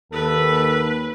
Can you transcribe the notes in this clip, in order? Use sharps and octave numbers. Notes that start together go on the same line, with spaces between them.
D#2 A4 B4